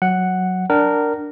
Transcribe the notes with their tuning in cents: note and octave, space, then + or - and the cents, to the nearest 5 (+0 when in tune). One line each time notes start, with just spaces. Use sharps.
F#3 +0 F#5 +0
D4 +0 A#4 -10 F#5 +35